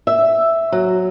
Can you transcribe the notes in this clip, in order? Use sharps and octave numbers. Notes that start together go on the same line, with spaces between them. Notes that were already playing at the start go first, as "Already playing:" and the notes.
E5
F#3